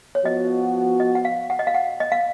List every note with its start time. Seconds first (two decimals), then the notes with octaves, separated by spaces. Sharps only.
0.15 C#5
0.25 F3 B3 F#4 D#5
1.00 D#5
1.15 F#5
1.25 F5
1.50 F#5
1.59 D#5
1.67 F5
1.74 F#5
2.00 D#5
2.12 F5